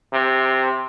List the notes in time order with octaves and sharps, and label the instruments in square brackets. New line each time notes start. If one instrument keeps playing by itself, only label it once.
[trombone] C3